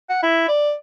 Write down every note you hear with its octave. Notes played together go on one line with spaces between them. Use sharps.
F#5
E4
D5